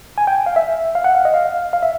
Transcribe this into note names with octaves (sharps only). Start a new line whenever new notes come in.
G#5
G5
F5
E5
F5
F#5
F5
D#5
F5
F5
E5